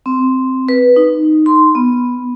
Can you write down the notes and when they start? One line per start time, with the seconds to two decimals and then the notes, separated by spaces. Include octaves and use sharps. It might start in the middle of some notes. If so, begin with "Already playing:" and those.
0.06 C4
0.68 B4
0.96 D#4
1.46 C6
1.75 B3